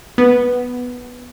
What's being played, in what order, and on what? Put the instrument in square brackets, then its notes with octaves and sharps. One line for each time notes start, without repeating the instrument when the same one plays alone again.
[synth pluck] B3